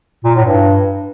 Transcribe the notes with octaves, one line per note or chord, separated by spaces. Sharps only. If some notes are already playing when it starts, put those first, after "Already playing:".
A#2
A2
G2